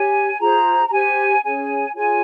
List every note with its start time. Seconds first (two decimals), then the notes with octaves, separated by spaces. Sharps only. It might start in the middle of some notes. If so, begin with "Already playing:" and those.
Already playing: G4 C#5 G#5
0.39 F4 G#4 C5 A#5
0.87 A#5
0.91 G4 C5 G#5
1.43 C#4 G#4 C#5 G#5
1.94 F4 G#4 C#5 G#5